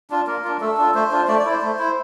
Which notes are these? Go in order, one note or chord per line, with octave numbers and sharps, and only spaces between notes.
D4 F4
A#3 A#4
D4 F4
A3 A4
D4 F4
A3 C5
D4 F4
A3 D5
D5
E4
C5
A3
E4